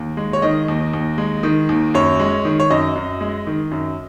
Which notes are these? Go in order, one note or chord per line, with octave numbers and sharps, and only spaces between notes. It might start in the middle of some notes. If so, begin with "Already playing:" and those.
Already playing: D#2
G#3
C#5
D#3 D#5
D#2
D#2
G#3
D#3
D#2
F#2 C#5
G#3
D#3
C#5
F#2 D#5
F#2
G#3
D#3
F#2